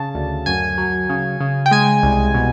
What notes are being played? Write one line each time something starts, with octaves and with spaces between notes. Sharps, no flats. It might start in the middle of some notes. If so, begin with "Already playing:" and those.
Already playing: C#3 A5
D2
F#2 G#5
F#3
C#3
C#3
G5
G#3 G#5
C2
B2